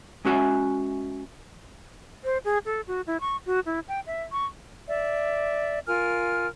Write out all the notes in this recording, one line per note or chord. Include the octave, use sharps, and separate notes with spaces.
G#3 C#4 F#4 E5 G#5
C5
G#4
A4
F#4
E4
C#6
F#4
E4
G5
E5
C#6
D5 E5
F4 A#4 G#5 F6